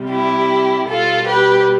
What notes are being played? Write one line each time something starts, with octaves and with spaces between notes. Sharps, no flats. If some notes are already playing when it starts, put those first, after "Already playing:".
Already playing: C3 G3
E4 G4
B2 G3 F4 A4
G4 B4